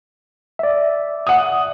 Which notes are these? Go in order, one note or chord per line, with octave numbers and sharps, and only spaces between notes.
D5 E5
F#5 D#6